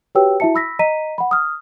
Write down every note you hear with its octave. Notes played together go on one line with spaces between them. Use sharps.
F#4 G4 B4 C#5 G5 E6
E4 F#4 E5 A5 C#7
B5 E6 A#6 B6
D#5 A#5 B6 D#7
F#5 B5
D#6 F6